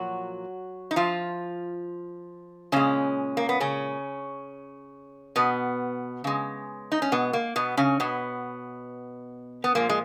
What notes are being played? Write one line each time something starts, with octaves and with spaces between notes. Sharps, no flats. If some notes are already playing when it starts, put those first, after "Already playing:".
Already playing: A#2 F3 F#3 F#4
D#4
F3 F4
A#2 C#3 G#3 C#4
A#3
B3
C#3 C#4
B2 B3
C#3 G#3
D#4
C#4
B2 B3
A#3
B2 B3
C#3 C#4
B2 B3
B3
A#2 F3 G#3 A#3
G#3